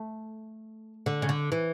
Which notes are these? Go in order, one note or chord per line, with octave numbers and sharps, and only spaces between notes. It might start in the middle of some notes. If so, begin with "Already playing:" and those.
Already playing: A3
D3
C#3
D3
E3